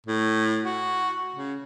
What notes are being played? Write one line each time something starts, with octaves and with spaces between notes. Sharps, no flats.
A2
F#4
C#3